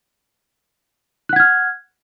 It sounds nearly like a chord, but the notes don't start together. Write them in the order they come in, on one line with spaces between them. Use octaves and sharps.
F#6 F#5 G#6 F6